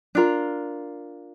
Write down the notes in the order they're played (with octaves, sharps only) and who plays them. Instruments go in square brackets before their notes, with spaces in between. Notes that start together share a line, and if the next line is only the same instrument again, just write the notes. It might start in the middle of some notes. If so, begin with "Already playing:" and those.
[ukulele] D4 F4 A#4